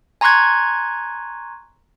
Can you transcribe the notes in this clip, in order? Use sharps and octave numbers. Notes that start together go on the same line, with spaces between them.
G#5 A#5 C6 C#6 F#6 G#6